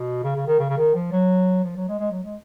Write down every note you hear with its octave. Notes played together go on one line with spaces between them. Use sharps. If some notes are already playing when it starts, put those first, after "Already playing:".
Already playing: B2
C#3
C#3
D#3
C#3
C#3
D#3
F3
F#3
F3
F#3
G#3
G#3
F#3
G#3